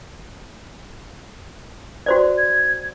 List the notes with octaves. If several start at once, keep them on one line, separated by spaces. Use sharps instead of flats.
F#4 C5 D5
G#6